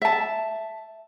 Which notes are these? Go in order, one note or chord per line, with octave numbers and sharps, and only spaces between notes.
E5 A5